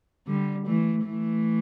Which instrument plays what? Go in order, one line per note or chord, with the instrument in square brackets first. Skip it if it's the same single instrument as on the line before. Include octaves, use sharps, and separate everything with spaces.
[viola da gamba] D3 G3
E3 A3
E3 A3